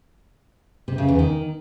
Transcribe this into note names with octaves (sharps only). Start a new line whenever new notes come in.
C3
C#3
E2
D#3